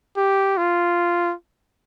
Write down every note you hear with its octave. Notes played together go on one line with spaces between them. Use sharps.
G4
F4